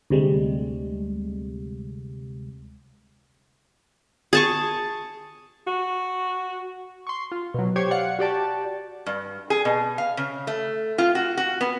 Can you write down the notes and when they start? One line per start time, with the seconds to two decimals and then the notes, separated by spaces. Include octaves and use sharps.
0.10 D2 C3 G3 G#3
4.33 G#4 A5 C#6
5.67 F#4
7.07 C6 C#6
7.32 F4
7.54 B2 F#3
7.76 G4 C5 C#5 G#6
7.91 D5 F5 F#5 C#7
8.19 F#4 G4 D5 A5
9.06 G2
9.50 G#4
9.65 B2
9.98 F5
10.17 C#3
10.47 A3
10.98 F4
11.15 F#4
11.38 F#4
11.61 B3